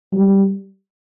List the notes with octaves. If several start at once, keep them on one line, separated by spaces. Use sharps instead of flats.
G3